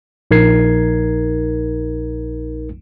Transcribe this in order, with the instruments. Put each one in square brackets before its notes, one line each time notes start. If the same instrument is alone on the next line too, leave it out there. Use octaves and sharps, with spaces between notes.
[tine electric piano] A#1 D#4 A#4 G#6 C7